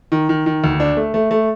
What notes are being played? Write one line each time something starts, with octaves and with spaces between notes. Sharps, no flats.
D#3
D#3
D#3
D2
D4
A3
A3
A3